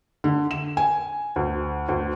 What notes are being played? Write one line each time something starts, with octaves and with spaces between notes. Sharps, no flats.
D3
E7
G#5
D2
D2